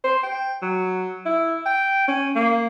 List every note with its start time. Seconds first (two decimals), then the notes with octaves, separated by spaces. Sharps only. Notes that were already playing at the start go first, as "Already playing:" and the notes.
0.04 C5
0.23 G5
0.62 F#3
1.25 E4
1.66 G5
2.08 C#4
2.36 A#3